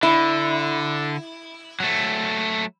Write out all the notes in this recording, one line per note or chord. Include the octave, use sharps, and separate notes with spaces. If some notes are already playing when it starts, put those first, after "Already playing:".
D3 E4
F#3 A3